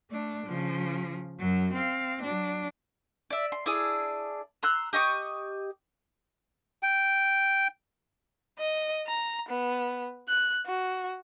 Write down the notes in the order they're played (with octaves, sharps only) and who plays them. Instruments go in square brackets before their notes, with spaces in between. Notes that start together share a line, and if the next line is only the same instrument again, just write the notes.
[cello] A3 D4
C#3 F3
F#2 F#3
C4 F5
F#3 D4
[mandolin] D5 E5
C6
D4 E4 G#4 D#6
A#5 C6 E6 F#6
G4 D#5 C#6 D#6
[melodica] G5
[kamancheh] D#5
A#5
B3
F#6
F#4